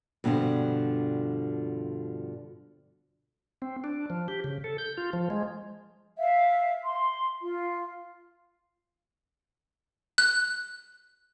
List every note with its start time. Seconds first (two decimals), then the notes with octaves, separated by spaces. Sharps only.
0.24 G2 B2 D3 D#3 F3
3.62 C4
3.84 D4
4.10 F3
4.28 G4
4.44 C#3
4.64 A4
4.78 G6
4.97 F4
5.13 F3
5.30 G#3
6.18 E5 F5
6.82 C6
7.41 F4
10.18 F#6